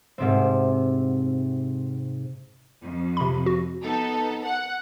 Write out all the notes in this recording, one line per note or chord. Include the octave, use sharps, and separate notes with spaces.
G#2 C3 C4
F2
C3 B5
F#4
B3 D#4 A4
F#5